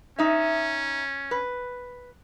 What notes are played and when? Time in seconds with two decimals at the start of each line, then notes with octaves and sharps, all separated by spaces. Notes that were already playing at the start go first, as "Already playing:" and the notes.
0.19 C#4 D#4 E5
1.31 B4